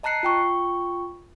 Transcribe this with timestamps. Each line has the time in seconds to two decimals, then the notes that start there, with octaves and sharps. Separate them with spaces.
0.03 D#5 A5 A#5 F#6 C7 C#7
0.23 F4 G5 C#6